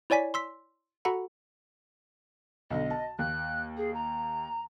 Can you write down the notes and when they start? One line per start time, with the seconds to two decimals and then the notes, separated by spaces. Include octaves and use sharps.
0.10 E4 C#5 D5 G#5 B6
0.34 C6 E6 B6
1.05 F#4 A4 F#5 A#5 B5
2.70 B1 D3 D#5
2.90 A5
3.19 D#2 F#6
3.77 G#4
3.94 A#5